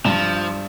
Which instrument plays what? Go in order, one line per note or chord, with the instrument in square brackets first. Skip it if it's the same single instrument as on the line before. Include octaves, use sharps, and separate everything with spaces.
[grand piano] G2 [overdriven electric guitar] F3